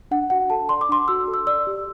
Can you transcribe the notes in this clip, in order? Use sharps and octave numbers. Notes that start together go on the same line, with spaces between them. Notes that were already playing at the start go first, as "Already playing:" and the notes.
D4 F#5
F#4 F#5
A4 A5
D5 C6
D6
D4 C6
F#4 E6
A4
E6
D5 E6
G4